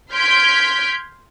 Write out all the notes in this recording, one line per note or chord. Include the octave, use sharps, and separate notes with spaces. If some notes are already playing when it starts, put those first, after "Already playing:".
C6 F6 G6 G#6 B6 D7